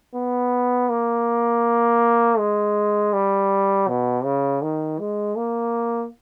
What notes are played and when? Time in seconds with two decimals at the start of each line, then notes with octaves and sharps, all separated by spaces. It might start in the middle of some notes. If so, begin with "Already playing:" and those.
0.15 B3
0.89 A#3
2.38 G#3
3.13 G3
3.88 B2
4.24 C#3
4.62 D#3
4.99 G#3
5.36 A#3